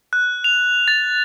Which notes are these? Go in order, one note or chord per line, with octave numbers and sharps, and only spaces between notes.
F#6
F7
A6